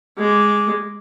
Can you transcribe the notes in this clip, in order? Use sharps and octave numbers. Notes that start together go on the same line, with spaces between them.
G#3 D6